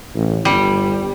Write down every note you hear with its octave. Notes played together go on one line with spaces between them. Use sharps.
A1
G1 G3